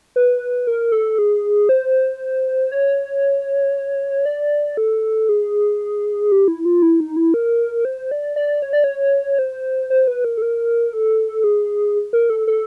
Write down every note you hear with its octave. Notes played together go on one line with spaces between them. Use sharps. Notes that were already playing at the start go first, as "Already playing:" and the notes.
B4
A#4
A4
G#4
C5
C#5
D5
A4
G#4
G4
E4
F4
E4
D#4
E4
A#4
C5
D5
D5
C#5
D5
C#5
C5
C5
B4
A#4
A4
A#4
A4
G#4
A#4
A4
A4